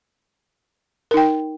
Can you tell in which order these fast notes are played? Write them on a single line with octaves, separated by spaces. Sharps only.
A#4 D#4 G5